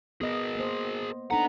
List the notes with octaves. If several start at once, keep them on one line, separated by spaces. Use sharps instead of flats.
B3 G#4 A#4 D#5
A#3 C5
B3 D4 D#4 A4 F#5 A#5